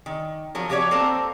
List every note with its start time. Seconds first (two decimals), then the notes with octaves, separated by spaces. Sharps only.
0.06 D#3
0.55 F3 F#3 A#4
0.69 F3 F#4 G4 A#4 C#5 D5
0.91 A#3 C4 A4 A#4 C5